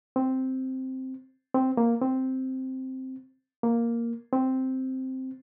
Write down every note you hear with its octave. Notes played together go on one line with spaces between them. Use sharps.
C4
C4
A#3
C4
A#3
C4